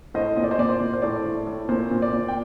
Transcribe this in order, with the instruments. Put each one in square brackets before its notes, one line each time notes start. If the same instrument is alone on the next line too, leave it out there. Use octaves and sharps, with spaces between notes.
[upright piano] A2 C5 D#5
A#2 D#5
D5
C5
A#2 D5
C5
A#2
C5
A2 D5
A2
A2
A#2 C5
A#2
D5
A#2
G5